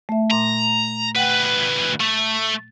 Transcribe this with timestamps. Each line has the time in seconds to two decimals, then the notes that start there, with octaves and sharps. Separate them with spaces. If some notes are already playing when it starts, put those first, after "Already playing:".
0.09 A3 E5
0.31 A#2 A#5 C6
1.16 D2 B4 F#5 G5
2.01 A3